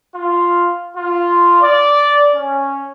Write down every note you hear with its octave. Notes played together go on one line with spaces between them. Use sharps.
F4
F4
D5
C#4